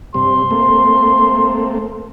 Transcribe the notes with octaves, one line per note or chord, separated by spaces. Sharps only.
G2 C3 C6
A3 A#3 C4